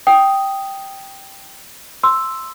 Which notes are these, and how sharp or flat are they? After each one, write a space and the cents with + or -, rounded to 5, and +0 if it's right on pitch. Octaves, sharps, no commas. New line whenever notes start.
G5 +0 D#6 +0
C6 +0 E6 +0